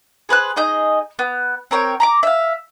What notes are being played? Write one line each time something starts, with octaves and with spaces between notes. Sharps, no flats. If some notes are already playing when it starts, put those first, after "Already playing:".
G#4 B4 C5 F#6
D#4 G#4 D#5 G6
B3
C4 A#4 C#5 G5
A#5 B5 D6
E5 F5